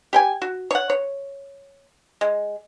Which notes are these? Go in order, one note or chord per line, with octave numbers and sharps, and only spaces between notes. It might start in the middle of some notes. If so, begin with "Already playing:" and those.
G4 G5 G#5
F#4
C#5 F#5
C#5
G#3